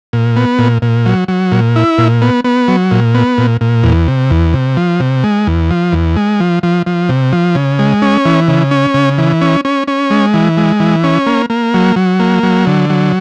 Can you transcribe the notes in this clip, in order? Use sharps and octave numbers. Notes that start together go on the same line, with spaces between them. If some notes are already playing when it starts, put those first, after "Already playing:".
A#2
B3
A#2
A#2
F#3
F#3
A#2
E4
A#2
B3
B3
F#3
A#2
B3
A#2
A#2
E2
C3
E2
C3
F3
C3
G#3
E2
F3
E2
G#3
F3
F3
F3
C3
F3
C#3
G#3
C#4
E3
C#3
C#4
C#3
E3
C#4
C#4
C#4
G#3
E3
G#3
E3
C#4
A#3
A#3
F#3
F#3
A#3
F#3
D3
F#3